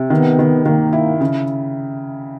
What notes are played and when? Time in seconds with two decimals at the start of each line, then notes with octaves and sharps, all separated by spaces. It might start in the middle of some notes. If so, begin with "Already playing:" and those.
Already playing: C3
0.10 D#3 B3
0.39 D#3
0.65 D#3 A#3
0.93 E4
1.21 C#3